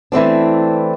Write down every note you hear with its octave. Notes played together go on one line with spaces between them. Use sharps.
E3 A3 C4 D4